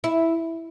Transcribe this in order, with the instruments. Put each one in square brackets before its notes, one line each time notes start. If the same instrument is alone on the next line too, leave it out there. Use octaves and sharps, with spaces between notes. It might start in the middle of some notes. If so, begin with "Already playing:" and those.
[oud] E4